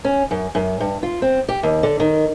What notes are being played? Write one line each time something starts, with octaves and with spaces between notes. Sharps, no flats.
C#4
F#2
F#2
G2
F4
C4
G4
D#2
D3
D#3